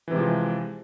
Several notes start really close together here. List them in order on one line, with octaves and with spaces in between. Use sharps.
E3 C3 G#3 F3